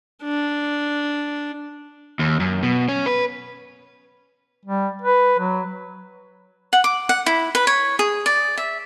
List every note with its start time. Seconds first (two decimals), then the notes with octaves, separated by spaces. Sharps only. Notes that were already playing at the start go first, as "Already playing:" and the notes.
0.23 D4
2.19 D#2
2.40 F#2
2.63 B2
2.89 C#4
3.06 B4
4.65 G3
5.02 B4
5.39 F#3
6.73 F#5
6.84 D6
7.09 F#5
7.26 E4
7.55 B4
7.67 C#5
7.99 G#4
8.26 D5
8.57 E5